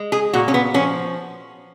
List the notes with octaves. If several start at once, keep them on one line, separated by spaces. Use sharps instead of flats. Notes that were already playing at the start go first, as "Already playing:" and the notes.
Already playing: G#3
G#4
A#2 F#4
C#4
B3
F3 C#4